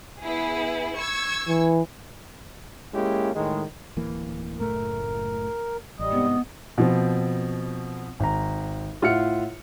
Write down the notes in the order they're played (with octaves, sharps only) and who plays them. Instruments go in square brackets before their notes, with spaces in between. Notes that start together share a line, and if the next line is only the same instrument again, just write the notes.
[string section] B3 E4 G#4
C#6 E6 G#6
[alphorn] E3
[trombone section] G#3 A#3 C#4 E4 G4
A2 D#3 G#3
[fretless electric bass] D1 E3 A#3
[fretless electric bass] F#1 A2 A3 [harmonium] A#4
[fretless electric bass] A1 [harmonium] G3 [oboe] D#5
[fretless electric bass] G#2 C3 [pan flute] B3
[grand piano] B2 F3 C4
G#1 A#5
A2 F4 E5 F#5 F6 C#7